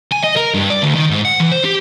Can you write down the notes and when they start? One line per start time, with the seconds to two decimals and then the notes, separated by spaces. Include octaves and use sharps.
0.12 G#5
0.24 D#5
0.37 A#4
0.55 G2
0.70 D5
0.82 D2
0.95 D#3
1.10 G#2
1.25 F#5
1.40 E3
1.52 C5
1.64 G4